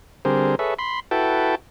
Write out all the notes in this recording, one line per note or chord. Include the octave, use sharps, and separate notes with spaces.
D3 G3 C4 G#4 A#4 C5
G#4 A4 B4 C#5 E5
B5 C6
E4 F#4 A4 B4 G5 A5